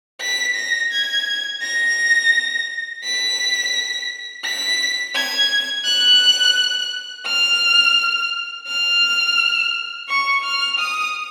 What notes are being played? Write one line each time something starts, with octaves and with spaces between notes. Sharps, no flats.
B6
A#6
G#6
A#6
B6
B6
G#6
F#6
F6
F6
C#6
F6
D#6